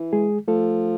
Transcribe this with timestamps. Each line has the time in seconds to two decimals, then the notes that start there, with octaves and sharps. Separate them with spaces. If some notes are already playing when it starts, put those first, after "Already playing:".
Already playing: E3
0.13 G#3 G#4
0.48 F3 A3 A4